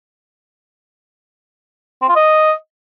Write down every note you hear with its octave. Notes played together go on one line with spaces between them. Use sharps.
C4
F4
D#5